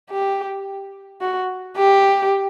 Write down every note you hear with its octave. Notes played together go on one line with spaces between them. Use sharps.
G4
F#4
G4